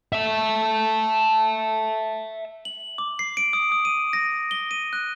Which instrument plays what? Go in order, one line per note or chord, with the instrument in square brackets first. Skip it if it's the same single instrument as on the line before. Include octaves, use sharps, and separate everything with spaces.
[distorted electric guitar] E5 A5
[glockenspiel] F#7
D6
C7
D7
D#6
D#6
D#7
A#6
G7
D#7
F#6